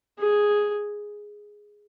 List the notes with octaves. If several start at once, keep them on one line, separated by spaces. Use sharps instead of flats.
G#4